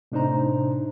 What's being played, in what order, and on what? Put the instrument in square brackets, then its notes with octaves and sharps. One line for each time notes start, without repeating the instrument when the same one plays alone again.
[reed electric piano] A2 C3 D4 D#4 C5 A#5